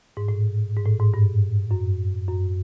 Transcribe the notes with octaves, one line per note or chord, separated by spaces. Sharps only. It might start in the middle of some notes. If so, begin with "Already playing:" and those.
G#2
A2
G#2
A2
G#2
G2
F#2
F#2